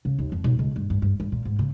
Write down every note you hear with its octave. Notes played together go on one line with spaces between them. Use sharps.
C#3
D#2
F2
B1
C#2
G2
G2
G2
G2
A#2
G#2
C#3